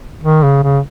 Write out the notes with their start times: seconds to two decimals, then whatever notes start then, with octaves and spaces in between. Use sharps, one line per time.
0.24 D#3
0.43 C#3
0.63 C#3